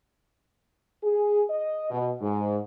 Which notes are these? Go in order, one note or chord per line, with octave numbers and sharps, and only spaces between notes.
G#4
D#5
B2
G#2